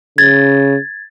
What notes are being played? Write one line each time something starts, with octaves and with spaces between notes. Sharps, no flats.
C#3 G#6 A6